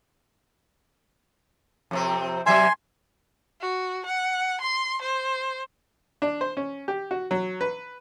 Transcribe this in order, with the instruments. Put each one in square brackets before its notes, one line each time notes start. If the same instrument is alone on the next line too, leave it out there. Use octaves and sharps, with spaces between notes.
[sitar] F2 C3 C4
[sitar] C3 F#3 E5 [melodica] G#5 C6
[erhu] F#4
F#5
C6
C5
[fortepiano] D4
C5
C#4
G4
F#4
F#3
B4